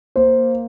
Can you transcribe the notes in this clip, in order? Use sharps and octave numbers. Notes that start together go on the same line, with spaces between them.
A#3 C5